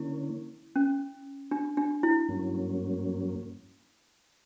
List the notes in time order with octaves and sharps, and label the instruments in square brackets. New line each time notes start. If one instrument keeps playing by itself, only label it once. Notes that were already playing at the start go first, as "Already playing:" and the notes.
Already playing: [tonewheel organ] D3 A#3 C#4 [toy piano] E4
[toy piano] C#4
D4
D4
E4
[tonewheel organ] G2 F#3 A#3 C#4